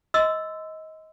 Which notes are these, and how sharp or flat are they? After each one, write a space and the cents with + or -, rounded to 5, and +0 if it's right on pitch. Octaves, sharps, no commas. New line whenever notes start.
D#5 +25 C6 -25 E6 +0